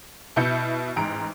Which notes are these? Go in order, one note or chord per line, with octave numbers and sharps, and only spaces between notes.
B2 E4 G6 C#7
A1 G#2 A#5 D7